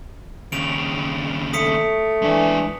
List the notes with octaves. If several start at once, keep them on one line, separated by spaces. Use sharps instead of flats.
D#2 C#3 D7 F7
A3 D#6 B6 C#7
E3 G#3 D4 E5